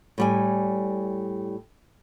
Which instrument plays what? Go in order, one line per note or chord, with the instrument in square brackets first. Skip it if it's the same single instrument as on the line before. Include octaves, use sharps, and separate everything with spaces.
[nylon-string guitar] A2 G3 G#5